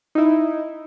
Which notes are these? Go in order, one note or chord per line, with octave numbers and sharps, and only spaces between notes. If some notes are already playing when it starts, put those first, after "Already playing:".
D#4 E4